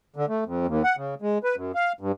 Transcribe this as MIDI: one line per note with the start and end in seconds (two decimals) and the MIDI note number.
0.16 0.26 50
0.29 0.44 57
0.46 0.66 41
0.66 0.83 39
0.84 0.96 78
0.97 1.15 49
1.22 1.38 56
1.44 1.56 71
1.56 1.72 42
1.75 1.92 77
2.00 2.12 43